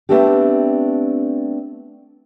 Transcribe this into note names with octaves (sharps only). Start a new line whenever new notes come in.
A3 B3 C4 D4 G4